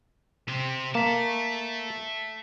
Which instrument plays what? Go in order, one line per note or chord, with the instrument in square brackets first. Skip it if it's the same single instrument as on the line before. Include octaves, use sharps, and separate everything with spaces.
[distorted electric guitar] C3 C4
[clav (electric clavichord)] A#3 [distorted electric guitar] E5 A5